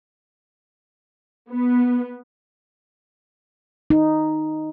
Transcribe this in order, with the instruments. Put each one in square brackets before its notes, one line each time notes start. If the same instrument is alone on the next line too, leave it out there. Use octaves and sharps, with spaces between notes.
[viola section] B3
[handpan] D#4